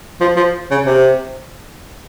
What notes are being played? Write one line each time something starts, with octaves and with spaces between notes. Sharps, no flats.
F3
F3
C#3
C3